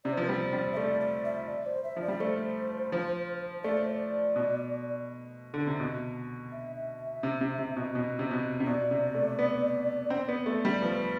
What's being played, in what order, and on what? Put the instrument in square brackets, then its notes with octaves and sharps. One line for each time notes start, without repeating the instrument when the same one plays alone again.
[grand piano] C3 [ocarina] D5
[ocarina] C5
[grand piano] F3 [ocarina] B4
[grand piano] G3 [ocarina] C5
[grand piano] G3
[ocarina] E5
[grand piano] A3 [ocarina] D5
[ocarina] D5
E5
D5
C5
E5
[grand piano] F3
[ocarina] D5
[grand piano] G3
[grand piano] A3 [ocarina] C5
[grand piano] F3
[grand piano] A3 [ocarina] D5
[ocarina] C5
D5
[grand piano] B2
D3
C3
B2
[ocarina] E5
E5
E5
[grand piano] C3
C3
C3
B2
B2
C3
B2
C3
[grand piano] B2 [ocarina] D5
[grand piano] C3
A3
B3
C4
B3
A3
G3
[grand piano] F3 [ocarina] B4